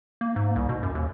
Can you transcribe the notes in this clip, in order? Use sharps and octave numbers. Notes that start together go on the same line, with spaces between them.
A#3
G#2
C2
B2
F#2
D#2